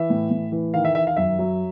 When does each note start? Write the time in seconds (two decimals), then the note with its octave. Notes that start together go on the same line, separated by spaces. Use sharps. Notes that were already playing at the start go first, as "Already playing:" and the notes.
Already playing: E3 E5
0.10 A2
0.31 A2
0.52 E3
0.74 D#3 F5
0.85 E5
0.95 D#3 E5
1.07 F5
1.16 F#2 E5
1.39 F#3